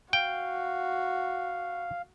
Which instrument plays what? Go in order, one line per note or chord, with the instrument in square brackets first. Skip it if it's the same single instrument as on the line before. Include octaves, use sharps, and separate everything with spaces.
[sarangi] F#4 [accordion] F5 [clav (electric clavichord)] G5